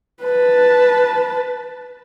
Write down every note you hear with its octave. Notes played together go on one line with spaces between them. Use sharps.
B4 A5